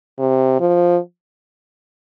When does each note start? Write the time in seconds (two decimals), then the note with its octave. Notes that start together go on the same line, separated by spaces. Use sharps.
0.19 C3
0.60 F3